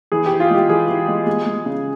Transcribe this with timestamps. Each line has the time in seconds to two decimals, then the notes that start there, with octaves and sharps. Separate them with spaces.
0.12 E3 G#4
0.26 G4
0.31 E3
0.40 F4
0.50 G#3 G4
0.69 E3 G#4
0.89 E3
1.08 G#3
1.26 G#3
1.46 G#3
1.66 C#3